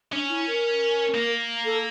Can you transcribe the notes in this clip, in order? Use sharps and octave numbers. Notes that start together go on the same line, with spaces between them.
C#4 D4
E4
A#4
A#3
A4